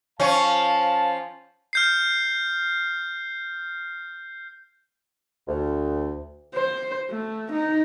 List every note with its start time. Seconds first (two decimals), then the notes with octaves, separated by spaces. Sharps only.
0.20 F3 C#4 F5 A5
1.73 F6 G6 C7
5.48 D2
6.54 C5
7.10 A3
7.51 D#4